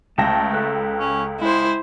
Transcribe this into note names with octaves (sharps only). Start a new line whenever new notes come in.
C#2 A3 G5 A5 A#6
A4 B4
C#4
G#3 E4 C5